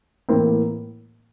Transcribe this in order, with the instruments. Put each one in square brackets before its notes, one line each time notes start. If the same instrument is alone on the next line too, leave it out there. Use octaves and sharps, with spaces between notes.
[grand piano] A2 E3 A#3 C4 E4